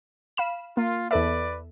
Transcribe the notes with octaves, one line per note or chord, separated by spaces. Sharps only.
F5 B5 E7
A#3 F4
E2 A4 B4 D5 E5